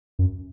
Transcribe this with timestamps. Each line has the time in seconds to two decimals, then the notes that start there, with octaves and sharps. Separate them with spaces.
0.19 F#2